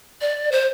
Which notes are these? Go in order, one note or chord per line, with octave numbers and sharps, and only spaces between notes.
D5
C5